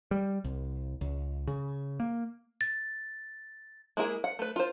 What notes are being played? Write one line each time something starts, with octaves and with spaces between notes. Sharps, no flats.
G3
C2
C#2
C#3
A#3
A6
G#3 A#3 E4 G#4
F#5
A3 B4
F4 C5